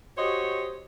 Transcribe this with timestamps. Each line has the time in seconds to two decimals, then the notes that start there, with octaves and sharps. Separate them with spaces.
0.18 F#4 G4 C5 C#5 D#5